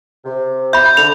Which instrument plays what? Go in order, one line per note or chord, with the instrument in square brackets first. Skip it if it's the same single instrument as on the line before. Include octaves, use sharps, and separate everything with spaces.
[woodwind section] C3
[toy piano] E5 B5 [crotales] G6
[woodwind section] D3 [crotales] F7